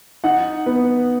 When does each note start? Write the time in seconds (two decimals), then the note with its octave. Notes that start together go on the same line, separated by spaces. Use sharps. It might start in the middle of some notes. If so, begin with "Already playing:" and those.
0.24 D#4 F#5
0.66 B3